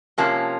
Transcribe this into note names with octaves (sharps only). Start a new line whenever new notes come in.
C3 F3 A#3 C#4 A5